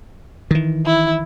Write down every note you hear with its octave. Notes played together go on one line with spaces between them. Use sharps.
D#3 E3
E4